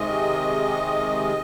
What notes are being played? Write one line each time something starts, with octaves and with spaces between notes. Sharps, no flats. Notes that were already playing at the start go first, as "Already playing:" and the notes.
Already playing: C3 D#3 G#3 D#5